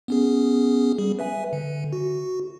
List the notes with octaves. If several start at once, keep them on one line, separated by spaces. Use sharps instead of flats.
B3 C#4 G#4
G3 G#4
B4 E5 G#5
D3
F#4